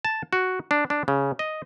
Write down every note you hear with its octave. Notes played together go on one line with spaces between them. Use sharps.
A5
F#4
D4
D4
C#3
D#5